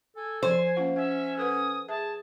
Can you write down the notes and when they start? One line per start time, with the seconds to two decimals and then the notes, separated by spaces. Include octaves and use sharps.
0.16 A4 G#5
0.43 F3 C5 G#5
0.77 A#3 C#4 F4 F#5
0.96 C#4 E5 F#5
1.38 A4 B4 F#5 D#6
1.89 G#4 E5 A5